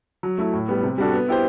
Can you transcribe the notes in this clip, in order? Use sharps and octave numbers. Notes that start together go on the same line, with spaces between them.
F#3
A3 E4
A2
G3 B3
C3
G3 D4 F#4 A4
B3
E4 G4 C5